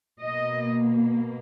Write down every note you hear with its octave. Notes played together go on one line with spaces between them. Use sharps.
B2 A#3 D#5